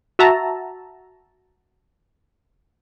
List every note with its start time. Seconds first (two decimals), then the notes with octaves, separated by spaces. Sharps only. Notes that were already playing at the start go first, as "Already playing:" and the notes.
0.19 F#4 E5 A5 A#5